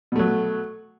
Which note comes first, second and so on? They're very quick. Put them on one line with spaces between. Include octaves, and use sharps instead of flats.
B2 A3 F#3